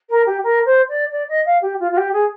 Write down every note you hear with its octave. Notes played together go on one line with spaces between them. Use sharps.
A#4
G4
A#4
C5
D5
D5
D#5
F5
G4
F4
F4
G4
G#4